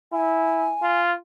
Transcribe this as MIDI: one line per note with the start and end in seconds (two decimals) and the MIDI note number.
0.12 0.73 64
0.12 0.99 80
0.82 1.12 65